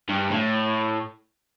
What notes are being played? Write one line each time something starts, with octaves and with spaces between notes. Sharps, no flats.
G2
A2